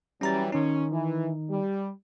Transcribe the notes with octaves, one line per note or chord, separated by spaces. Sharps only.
E3 F#3 G3 C#4 A#5 A6
D#3 C#4 D#4
E3
G3